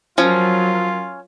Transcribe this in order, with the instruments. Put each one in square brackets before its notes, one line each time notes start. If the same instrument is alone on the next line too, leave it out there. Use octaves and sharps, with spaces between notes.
[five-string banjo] F3 [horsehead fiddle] F#3 A#4 [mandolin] C#4 [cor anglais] F4